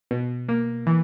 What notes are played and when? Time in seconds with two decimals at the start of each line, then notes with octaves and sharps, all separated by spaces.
0.11 B2
0.49 A#3
0.87 E3